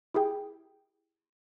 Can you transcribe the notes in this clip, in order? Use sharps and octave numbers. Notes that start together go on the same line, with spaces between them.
E4 G4 G#4 G5